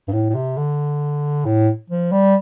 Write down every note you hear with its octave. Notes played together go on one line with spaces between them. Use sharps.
G2
A2
A2
C3
D3
A2
F3
G3